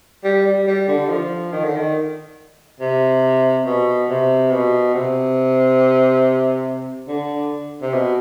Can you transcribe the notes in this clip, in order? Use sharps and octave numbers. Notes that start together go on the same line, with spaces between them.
G3
G3
G3
D3
F3
D#3
D3
D#3
C3
B2
C3
B2
C3
D3
C3
B2